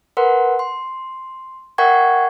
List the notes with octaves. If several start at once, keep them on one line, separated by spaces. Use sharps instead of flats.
A#4 B4 F#5 C6
C6
A#4 E5 F#5 G5 C#6 G#6